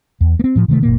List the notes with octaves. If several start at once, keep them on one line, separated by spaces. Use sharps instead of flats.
E2
A#3 C4
A2 F3
C3 D#3 G#3 A3
F#1 A#2 A#3